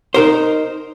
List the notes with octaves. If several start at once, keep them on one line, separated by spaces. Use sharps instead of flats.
D#4 A#4 C5